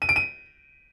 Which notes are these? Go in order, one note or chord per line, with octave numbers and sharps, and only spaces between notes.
D#7
D7
D#7